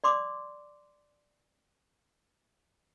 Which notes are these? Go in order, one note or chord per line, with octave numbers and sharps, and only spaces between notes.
D5 C6 D6